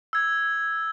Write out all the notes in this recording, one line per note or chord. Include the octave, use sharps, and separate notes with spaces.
E6 G#6